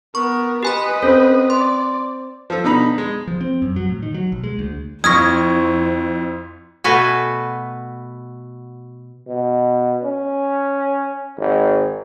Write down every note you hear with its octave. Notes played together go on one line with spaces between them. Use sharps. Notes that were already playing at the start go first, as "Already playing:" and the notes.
B3 A#4 C#6
G4 B4 D#5 G#5 B5
C4 C#4 A4
D5 C6
F3 A4
B2 D3 D#4 A#5 B5
G#3
F3
C4
F#2
F#3
A2
D#3
F#3
B1
G#3
D2
F2 E4 C5 C#6 D#6 F6 G#6 A#6
B2 A3 F#4 B4 G#5
B2
C#4
G#1